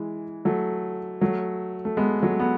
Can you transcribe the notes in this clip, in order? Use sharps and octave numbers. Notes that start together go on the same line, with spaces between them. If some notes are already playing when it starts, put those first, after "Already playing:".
Already playing: E3 G#3
F#3 A3
F#3 A3
A3
G#3 B3
F#3 A3
B3